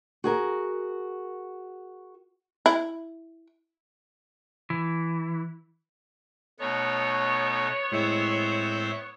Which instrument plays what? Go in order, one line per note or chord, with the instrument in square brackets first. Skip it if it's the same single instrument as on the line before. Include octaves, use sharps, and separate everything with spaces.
[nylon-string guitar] F#4 G#4 A#4
[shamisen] E4
[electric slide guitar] E3
[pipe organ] B2 A3 D#4 [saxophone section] B3 C#5
[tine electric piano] A2 G#3 E4 [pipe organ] C4 C5 E5